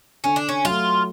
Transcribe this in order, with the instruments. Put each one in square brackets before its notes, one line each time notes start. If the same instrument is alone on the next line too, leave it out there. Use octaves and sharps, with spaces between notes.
[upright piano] D3 [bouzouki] C#4
[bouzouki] D4
C#4
[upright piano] F#3 A3 [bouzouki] F4